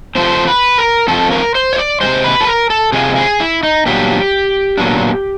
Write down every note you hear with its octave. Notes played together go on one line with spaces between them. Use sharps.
F3 A3 C4 C5
B4
A#4
F3 A3 C4 A4
A#4
C5
C#5
D5
C3 F3 G#3 C5
B4
A4
A#4
A4
C3 F3 G#3 G#4
G#4
E4
D#4
A#2 F#3 B3 D4 G4
A#2 F#3 B3 D4